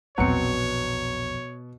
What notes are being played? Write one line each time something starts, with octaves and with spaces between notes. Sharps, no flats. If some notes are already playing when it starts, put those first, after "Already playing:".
A#1 E2 B2 F#3 C4 C#5 C#7